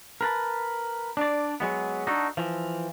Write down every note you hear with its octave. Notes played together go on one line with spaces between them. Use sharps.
A#4 B4 A5
D4 D5
F#3 G#3 B3
D4 D#4 F#4 A4
E3 F3